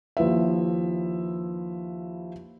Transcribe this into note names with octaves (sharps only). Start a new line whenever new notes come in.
D#2 F3 E4 B4 E5